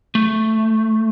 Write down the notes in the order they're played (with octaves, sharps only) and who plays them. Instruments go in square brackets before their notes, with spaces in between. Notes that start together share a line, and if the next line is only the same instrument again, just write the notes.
[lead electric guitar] A3